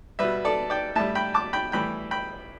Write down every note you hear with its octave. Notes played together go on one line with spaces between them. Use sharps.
B2 G3 B4 E5
A4 D5
D5 G5
A2 G3 E5 A5
G5 B5
A5 D6
G5 B5
A2 E3 G3 G5 B5
G5 B5